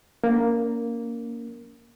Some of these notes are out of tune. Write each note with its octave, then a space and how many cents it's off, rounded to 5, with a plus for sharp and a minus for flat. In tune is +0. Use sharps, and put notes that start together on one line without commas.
A#3 +0 C#4 +40